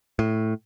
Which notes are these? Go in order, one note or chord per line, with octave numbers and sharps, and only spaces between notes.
A2